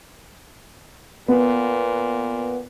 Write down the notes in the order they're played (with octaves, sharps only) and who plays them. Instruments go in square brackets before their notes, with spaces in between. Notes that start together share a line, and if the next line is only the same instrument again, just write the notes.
[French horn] A#2 [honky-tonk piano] B3